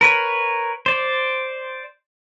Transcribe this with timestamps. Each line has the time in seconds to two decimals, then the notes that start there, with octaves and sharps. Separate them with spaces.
0.01 A#4 B4 C#5
0.86 C5 D5